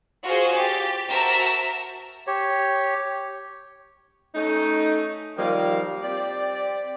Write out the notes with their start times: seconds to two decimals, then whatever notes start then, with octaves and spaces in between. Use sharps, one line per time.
0.24 F4 F#4 G#4 C5
0.55 G4 A6
1.10 F#4 A#4 C5 E5 A5 A#5
2.27 G4 C#5
4.35 A3 C#4 D#4
5.38 D#3 F3 G3 A#3
6.03 C4 G4 D5